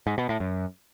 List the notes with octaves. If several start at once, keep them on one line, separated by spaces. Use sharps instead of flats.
G#2
B2
A2
F#2